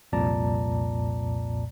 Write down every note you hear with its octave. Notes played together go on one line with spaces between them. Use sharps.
C2 F2 A#2 D5 A5 A#5